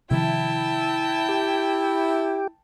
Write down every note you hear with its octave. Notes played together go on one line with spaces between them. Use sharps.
C3 D#3 F3 E4 G5 A5
G4